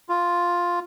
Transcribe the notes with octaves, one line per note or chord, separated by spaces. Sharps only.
F4